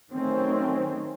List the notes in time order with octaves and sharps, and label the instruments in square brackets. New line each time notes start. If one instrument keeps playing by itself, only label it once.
[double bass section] D#3 F#3 A3 C4 C#4